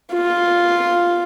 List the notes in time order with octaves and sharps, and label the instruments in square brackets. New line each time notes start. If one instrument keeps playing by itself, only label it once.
[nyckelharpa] F4